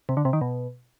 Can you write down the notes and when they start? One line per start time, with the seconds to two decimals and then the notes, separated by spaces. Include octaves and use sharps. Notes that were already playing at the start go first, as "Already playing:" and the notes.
0.09 C3
0.17 D3
0.25 C3
0.33 D#3
0.41 B2